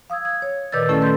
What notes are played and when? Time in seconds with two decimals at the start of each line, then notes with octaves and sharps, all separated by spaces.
0.10 F5 D#6 E6 G#6
0.25 G#6
0.42 C#5
0.72 A#2 D#3 B4 D5 E6 A6
0.89 A3 C#4 E4 A4
1.02 B4 C6 G6 A6